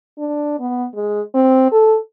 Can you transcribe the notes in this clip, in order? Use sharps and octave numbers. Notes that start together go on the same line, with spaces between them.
D4
B3
G#3
C4
A4